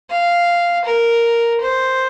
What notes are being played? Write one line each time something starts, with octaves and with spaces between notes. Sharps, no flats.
F5
A#4
C5